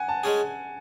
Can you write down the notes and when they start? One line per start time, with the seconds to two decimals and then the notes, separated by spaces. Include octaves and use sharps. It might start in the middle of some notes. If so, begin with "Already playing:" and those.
Already playing: F#5 G#5
0.08 A5
0.23 G#3 C#4 G#4